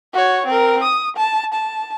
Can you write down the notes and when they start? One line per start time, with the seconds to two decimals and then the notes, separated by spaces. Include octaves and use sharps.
0.14 F#4 C#5
0.46 C4 A#4
0.83 D#6
1.16 A5
1.53 A5